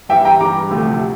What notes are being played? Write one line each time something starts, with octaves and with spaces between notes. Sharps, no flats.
G2 E3 G3 E5 G5
G5 A#5
G2 E3 G3 A#5 D6
D2 C3 F3 A3